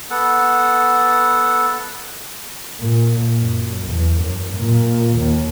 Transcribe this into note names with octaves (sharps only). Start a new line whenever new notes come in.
B3 A4 F#5
A#2
F#2
E2
F#2
A#2
D#2